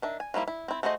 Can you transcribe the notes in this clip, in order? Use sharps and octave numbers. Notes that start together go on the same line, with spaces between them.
D#3 D4 E5
G#5
F3 G3 A#3 E4
E4
C4 E4
A3 F#4 G#4 C5 D#5